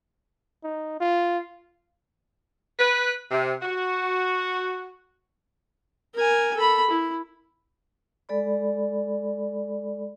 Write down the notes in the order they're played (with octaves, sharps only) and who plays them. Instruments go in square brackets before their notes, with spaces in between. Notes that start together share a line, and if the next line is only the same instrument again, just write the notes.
[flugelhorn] D#4
F4
[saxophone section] B4
C3
F#4
[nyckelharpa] A#4 G#5
A4 B5
E4
[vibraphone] G#3 A4 D5 B5